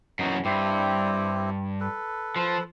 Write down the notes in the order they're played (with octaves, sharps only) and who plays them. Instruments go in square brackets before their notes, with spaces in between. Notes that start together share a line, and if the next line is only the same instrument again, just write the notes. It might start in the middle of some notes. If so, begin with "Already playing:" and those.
[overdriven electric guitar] F#2 E3 [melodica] B3 D#4
[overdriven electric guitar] G2 [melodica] C4 E4 G4
[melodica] A4 B4
[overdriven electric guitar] F3